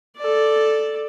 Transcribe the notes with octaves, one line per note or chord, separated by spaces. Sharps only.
A4 D5